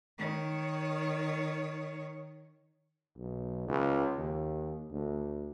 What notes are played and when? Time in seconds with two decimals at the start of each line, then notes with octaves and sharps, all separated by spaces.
0.19 D#3 C#5
3.18 B1
3.68 C#2
4.17 D#2
4.91 D2